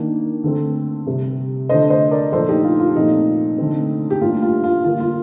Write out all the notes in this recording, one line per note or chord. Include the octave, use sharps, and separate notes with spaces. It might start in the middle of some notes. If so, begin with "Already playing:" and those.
Already playing: D#3 A#3 D4
D3 A3 C4
C3 G3 C4
D3 A3 D4 C5 D#5
C5 D#5
A#4 D5
A#2 F3 A3 D4 A4 C5
D#4 G4
F4
F4
A#2 F3 A3 C4 D#4
D3 A3 C4
G4
A2 G3 A#3 D4 F4
F4
F4
D3 G3 A#3 F4
F4